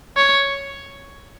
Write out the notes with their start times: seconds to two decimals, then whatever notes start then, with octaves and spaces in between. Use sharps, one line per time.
0.17 C#5